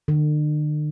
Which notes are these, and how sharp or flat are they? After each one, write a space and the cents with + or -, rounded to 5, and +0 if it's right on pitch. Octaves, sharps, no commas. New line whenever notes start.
D3 +45